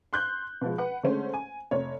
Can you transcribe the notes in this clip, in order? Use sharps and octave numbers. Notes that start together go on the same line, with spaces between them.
C6 F#6 G6
B2 F3 G#3
B4 F#5
D3 G#3 A3 C#4 C5
G#5
F1 C#5